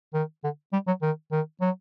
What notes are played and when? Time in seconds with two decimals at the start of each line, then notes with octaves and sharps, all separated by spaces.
0.14 D#3
0.44 D3
0.73 G3
0.87 F#3
1.02 D#3
1.32 D#3
1.61 F#3